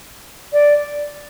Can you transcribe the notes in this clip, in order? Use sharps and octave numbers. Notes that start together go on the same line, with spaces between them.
D5